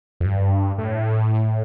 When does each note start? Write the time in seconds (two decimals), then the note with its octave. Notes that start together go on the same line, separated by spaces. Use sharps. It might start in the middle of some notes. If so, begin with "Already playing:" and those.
0.20 F2
0.25 G2
0.78 A2